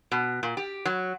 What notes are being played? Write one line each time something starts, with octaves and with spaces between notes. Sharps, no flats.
B2
A#2
G4
F#3